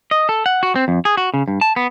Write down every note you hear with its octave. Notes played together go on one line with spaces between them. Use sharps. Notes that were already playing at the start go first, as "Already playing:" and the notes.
D#5
A4
F#5
F#4
C4
F2
G#4
F#4
C#3
G2
A5
B3